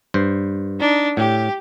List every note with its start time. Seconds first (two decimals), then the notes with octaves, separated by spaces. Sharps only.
0.14 G2 C5
0.80 D4 D#4
1.17 A2 G4